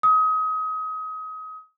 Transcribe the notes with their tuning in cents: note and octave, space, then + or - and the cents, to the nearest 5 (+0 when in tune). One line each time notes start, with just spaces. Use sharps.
D#6 +30